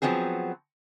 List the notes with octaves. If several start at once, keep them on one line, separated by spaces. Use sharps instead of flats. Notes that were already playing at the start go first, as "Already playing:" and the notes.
F3 F#3 B3 C4 G#4